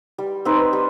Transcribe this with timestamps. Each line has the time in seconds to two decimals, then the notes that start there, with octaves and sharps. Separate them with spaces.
0.18 G3
0.45 C4 D#4 B4
0.73 G3